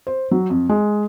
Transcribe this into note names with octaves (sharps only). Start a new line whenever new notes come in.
C5
F#3
F2
G#3